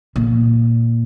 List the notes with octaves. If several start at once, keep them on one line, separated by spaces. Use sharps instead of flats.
A#2